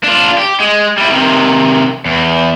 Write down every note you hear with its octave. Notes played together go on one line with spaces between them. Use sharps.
D4 F4
G4
G#3
G3 E4
C3 D#3
E2